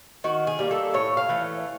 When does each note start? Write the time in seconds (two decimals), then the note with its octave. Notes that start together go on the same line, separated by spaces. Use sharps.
0.24 D#3 F#4
0.47 G#4
0.59 G3 A#3
0.71 A4
0.94 A2 C#5
1.17 F5
1.29 E3 A3